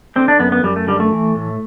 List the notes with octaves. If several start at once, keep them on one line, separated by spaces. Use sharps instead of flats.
D3 C4
D4
F#2 B3
B3
F#2 G3
A3
D3 G3
A3
E3
A2